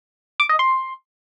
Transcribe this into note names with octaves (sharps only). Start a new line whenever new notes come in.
D6
D#5
C6